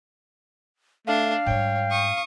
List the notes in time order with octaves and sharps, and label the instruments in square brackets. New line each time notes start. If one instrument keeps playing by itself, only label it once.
[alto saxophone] A3 [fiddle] D4 [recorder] F5
[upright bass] G#2 G3 [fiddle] C#5 [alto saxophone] G5
[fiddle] C#6 D#6